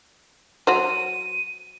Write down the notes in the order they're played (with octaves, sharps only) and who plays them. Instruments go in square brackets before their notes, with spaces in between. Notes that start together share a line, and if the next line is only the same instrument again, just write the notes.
[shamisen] F#3 F#4 C5 [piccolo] D#7